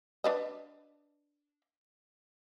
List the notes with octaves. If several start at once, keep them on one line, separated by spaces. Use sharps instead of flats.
D4 B4 D#5